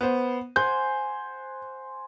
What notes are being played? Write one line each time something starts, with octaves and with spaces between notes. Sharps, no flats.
B3 C5
C5 F#5 G#5 G6